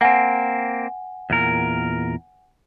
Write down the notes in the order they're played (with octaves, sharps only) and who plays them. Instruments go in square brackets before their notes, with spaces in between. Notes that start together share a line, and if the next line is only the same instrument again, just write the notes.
[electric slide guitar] A#3 C4 [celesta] F#5 G#5
[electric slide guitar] E2 A#2 A#4